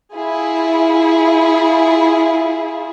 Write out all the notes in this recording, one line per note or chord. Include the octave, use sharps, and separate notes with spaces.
E4 F4 G#4